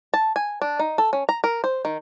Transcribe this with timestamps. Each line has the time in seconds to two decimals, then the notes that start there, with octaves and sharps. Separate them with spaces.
0.14 A5
0.36 G#5
0.62 D4
0.79 D#4
0.98 A4
1.13 C#4
1.29 A#5
1.44 A#4
1.64 C5
1.85 D#3